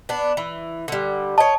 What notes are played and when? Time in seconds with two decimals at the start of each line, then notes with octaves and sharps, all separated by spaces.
0.09 B3 D4
0.37 E3
0.88 D3 G3
1.38 C#5 D#5 A5